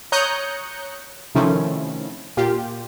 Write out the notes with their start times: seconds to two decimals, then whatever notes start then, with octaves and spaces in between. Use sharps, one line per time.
0.12 C#5 A#5 D#6 F#6 G6 C#7
1.35 C3 D#3 F3 A3 C#4 E4
2.37 A#2 F4 G4